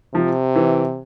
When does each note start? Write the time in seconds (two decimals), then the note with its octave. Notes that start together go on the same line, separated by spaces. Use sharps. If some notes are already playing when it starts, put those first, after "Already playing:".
0.14 C3 F3
0.55 E3